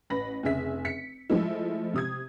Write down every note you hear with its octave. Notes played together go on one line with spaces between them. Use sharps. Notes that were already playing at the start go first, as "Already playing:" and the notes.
A1 B4 B5 A#6
F1 C#3 G#4 E5 B6
B6 C#7
F3 G#3 A3 E4
C3 D#6 G#6